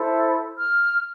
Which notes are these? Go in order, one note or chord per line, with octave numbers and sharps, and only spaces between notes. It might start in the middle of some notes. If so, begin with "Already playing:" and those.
Already playing: E4 A4 C5
F6